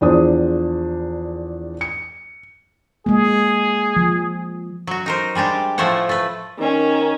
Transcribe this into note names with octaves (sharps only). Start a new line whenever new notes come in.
E2 F3 D4 G#4 C5 D#6
C#7
G#3 A#3 G#4
F3
F#3 F#4
D#4 A#4 C5
G3 G#3 D4 G4
A2 F3 A3 C5 C#5 F#5
A3 B4
D#3 C#4